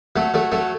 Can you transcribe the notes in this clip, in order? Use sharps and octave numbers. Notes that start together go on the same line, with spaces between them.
F#3 A3
F#3 A3
F#3 A3